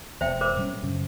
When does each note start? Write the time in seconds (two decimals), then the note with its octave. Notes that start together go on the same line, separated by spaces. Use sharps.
0.21 E1 E2 C5 E5 G5
0.41 A#4 C5 D6
0.56 A#2 G3 C#4
0.83 F#2 C#3